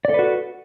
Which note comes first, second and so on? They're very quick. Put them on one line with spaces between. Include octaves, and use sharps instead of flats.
D5 A4 B4 F#4